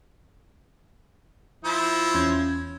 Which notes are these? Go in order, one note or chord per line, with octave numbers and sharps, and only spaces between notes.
F3 E4
E2 C#4 G#6